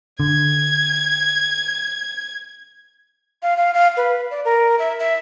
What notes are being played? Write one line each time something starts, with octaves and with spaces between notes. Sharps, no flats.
D3 G#6
F5
F5
F5
B4
D5
A#4
E5
E5